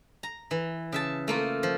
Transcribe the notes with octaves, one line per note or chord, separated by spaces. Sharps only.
A#5
E3
C#3 E5 A5
A3 A#3 F4
F3